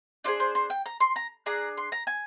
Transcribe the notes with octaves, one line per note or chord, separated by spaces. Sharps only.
D4 F4 G#4 C5
C5
C5
G5
A#5
C6
A#5
D4 G#4 A#5
C6
A#5
G#5